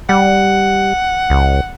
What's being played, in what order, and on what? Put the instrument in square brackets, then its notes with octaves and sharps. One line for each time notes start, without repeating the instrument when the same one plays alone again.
[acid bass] G3 [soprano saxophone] F#5
[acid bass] C#2